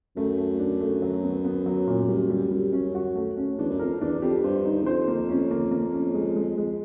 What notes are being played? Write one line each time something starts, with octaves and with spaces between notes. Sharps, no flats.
F#2 A3
A3
D4
A3
F#3
B3
B3
F#3
A#2
G3
G3
G3
C#4
F#4
A3
C#4
E2 D4
F#2
F2 A#4
E2 D4
F2 G4
G2 C5
D#4
E2
F2 C5
A#3
F2 C#4
A#3
A#3
C#4
G#3
G#3
G#3